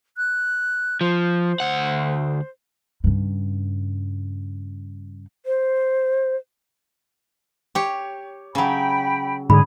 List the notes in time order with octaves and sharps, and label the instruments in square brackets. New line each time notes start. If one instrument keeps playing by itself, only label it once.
[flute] F#6
[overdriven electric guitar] F3 [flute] C5
[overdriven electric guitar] D2 F#5
[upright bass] G2 C#3
[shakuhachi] C5
[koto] G4 C#5
[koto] C#3 F#3 [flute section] G5 B5
[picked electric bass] G#2 D3 [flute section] G#4 [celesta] B5